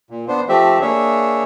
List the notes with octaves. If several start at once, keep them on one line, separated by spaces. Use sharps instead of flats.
A#2
B3 D4 C5
F3 A3 C4 G4 E5
A#3 D4 G#4 C#5 E5